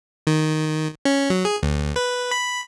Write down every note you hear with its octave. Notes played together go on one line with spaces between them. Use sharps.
D#3
C#4
F#3
G#4
D2
B4
B5